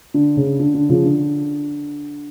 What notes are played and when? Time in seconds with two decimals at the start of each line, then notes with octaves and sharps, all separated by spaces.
0.14 D3
0.37 C#3
0.59 D3
0.74 D3
0.89 C#3 F3
1.04 D3